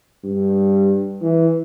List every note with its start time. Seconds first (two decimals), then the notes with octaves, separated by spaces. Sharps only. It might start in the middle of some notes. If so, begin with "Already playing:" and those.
0.24 G2
1.22 E3